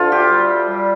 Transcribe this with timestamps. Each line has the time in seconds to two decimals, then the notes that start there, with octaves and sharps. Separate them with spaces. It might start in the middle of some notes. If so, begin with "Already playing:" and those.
Already playing: D2 D3 F4 A4
0.12 G4
0.30 G3
0.68 G3